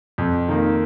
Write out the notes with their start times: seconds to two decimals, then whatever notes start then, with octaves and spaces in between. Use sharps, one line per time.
0.18 F2
0.48 D#3 A#3